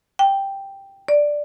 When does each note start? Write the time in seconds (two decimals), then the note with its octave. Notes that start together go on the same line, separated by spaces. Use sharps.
0.19 G5
1.08 D5